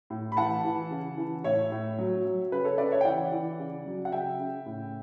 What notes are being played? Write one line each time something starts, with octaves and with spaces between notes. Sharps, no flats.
A2
B5
E3 F#5 A5
E3
C#3
E3
A2 C#5 E5
A2
F#3
F#3
C#3 B4
A4 C#5
C#3 B4 D5
C#5 E5
G5
E3 D5 F#5
E3
C#3
F#3
F#5
C#3 E5 G5
C#3
A2